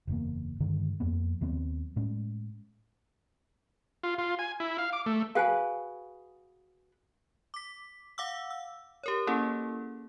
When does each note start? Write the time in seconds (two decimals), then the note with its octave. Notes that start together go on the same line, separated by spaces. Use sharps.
0.07 F#1 E2 A#3
0.60 G2 D3 D#3 G#3
1.00 F2 A#3 B3
1.41 D#2 F#3 B3 C4
1.96 A2 G#3 C#4
4.03 F4
4.18 F4
4.39 G#5
4.60 E4
4.78 F5
4.93 D6
5.06 A3
5.35 F#4 G#4 B4 F5 G5 G#5
7.54 D6 B6
8.18 F5 F#5 D6 E6
8.50 E6
9.03 G4 A#4 C#5
9.27 A#3 C#4 E4 G#4 A4